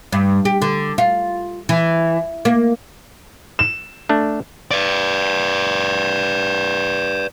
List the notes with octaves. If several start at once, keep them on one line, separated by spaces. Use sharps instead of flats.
G2
G4
D3
F4
E3
A#3
E7
A3 D4
B4 D5